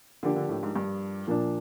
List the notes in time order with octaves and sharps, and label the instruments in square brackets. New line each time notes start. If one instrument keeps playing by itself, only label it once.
[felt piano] D3 [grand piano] F3 A#3 D4 G4
[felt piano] D3
A2
G#2
G2
[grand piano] A#2 F3 A#3 D4